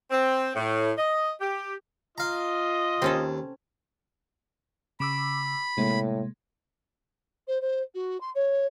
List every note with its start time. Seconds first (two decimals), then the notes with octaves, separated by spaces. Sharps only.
0.10 C4
0.54 A2
0.96 D#5
1.40 G4
2.18 F4 D#5 F5 A#5
3.02 D#2 C4 C#4 A4
5.00 C#3 B5 D6 E6
5.78 A2 C3 G#3 A#3
7.47 C5
7.61 C5
7.94 F#4
8.20 C6
8.35 C#5